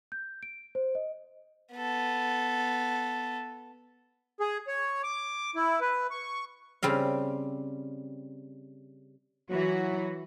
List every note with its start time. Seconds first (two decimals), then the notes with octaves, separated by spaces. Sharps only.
0.12 G6
0.43 D7
0.75 C5
0.95 D#5
1.75 B3 A4
4.40 G#4
4.67 C#5
5.03 D6
5.56 E4
5.81 B4
6.11 C#6
6.83 C#3 G3 C4 F5
9.50 E3 F#3 F#4